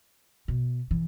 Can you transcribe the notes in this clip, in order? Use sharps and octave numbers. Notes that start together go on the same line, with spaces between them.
B2
E3